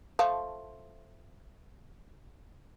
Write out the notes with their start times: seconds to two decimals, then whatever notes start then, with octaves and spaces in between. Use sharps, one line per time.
0.19 F3 A3 F5